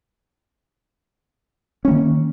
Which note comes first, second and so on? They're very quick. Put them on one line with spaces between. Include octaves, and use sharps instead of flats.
C#4 A#3 D#3